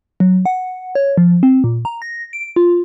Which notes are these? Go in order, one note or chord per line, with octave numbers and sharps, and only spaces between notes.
F#3
F#5
C#5
F3
C4
A#2
A#5
A#6
D7
F4